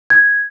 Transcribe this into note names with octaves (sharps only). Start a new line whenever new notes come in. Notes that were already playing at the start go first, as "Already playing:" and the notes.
G#6